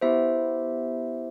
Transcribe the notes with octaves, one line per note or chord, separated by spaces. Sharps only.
B3 E4 G4 C5 E5